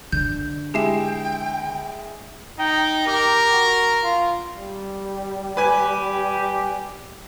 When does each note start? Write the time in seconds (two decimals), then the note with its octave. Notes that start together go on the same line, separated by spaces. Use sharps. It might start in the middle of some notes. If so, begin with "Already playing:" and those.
0.12 D3 G6
0.74 G#3 E4 G4 G5 C7 E7
2.59 D#4 G5
3.07 G4 A#4
3.52 F#4
4.03 F4
4.54 G3
5.57 G4 B4 G#5